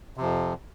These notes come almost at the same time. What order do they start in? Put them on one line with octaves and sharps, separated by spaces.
C3 F3 F2